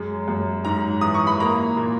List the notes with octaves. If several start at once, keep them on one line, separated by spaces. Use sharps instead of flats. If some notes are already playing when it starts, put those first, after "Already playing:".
Already playing: F#2 G#3
F#2
G#2 A#5
E3 D#6
C#6
B5
A#3 A#5
A#2